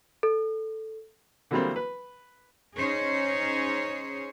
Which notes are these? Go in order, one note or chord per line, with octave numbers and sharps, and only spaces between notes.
A4
D3 E3 F#3 G3 A#3 C4
B4
C#4 D#4 G#4 C5 C#5